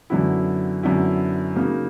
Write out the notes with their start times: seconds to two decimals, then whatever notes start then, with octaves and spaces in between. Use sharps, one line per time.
0.10 F#2 D3 F#3 B3 E4
0.83 F#2 D3 F#3 B3 E4
1.56 C#3 F#3 A#3 D#4